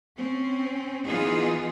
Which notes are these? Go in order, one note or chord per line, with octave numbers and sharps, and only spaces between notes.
C4 C#4
E3 B3 D#4 F4 G#4